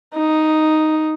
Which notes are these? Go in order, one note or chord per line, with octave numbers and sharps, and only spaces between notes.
D#4